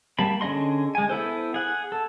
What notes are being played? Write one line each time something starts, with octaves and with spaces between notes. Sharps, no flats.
G3 A#3 A5 B5
D3 C#4 G#4 D#5 C6
G#3 G#5
B3 E4 A4 C5
G#4 F#5
A4